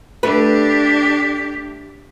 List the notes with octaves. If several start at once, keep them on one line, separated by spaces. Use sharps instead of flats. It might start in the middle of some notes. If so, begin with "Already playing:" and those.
A3 D4 G4 B4